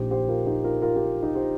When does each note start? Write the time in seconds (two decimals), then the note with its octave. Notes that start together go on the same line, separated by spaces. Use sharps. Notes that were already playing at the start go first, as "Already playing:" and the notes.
Already playing: A#1 A#2 F3 D#4 G4 C5
0.11 G4 C5
0.28 F4 A#4
0.46 D#4 G4
0.64 F4 A#4
0.82 F4 A#4
0.96 D#4 G4
1.22 D#4 G4
1.35 G4 C5